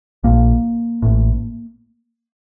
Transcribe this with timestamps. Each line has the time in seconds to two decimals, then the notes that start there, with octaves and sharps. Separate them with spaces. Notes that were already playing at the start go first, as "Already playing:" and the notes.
0.24 A#1 A#2 A#3
1.02 A1 A2